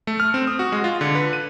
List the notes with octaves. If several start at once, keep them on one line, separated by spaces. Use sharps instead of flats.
A3
F6
C4
D#6
F#4
G#3
F4
D3
B4
D#7